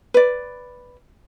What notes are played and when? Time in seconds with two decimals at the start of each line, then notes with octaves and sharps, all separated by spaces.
0.14 B4 D5